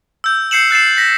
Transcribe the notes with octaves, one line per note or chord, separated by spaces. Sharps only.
E6 G6
G6 C7 C#7 E7 F#7
F#6 A6 C7 E7
A#6 B6